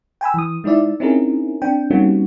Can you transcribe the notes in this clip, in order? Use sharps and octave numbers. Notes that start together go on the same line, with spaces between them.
G5 G#5 B5 E6
E3 D#6
G#3 D#4 E4 D5 E5
C4 C#4 D#4 E4 G#4 A#4
C4 D4 G5
G3 A#3 C4 C#4 D#4 F#4